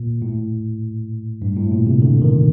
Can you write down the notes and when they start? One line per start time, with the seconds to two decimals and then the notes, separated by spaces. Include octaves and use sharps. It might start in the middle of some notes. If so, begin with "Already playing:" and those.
Already playing: A#2
0.22 A2
1.42 G2
1.56 A2
1.72 A#2
1.87 C3
2.02 D3
2.22 D#3